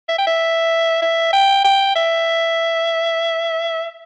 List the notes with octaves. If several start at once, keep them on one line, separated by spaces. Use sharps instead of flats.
E5
G5
E5
E5
G5
G5
E5